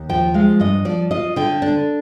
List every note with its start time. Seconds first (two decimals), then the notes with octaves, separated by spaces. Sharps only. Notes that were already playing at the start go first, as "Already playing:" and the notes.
Already playing: D#2
0.09 F3 G5
0.34 G#3 F5
0.60 G2 D#5
0.85 F3 D5
1.11 F4 D#5
1.36 D3 G5
1.62 D4